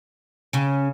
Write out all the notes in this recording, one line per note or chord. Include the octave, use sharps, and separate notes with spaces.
C#3 C#4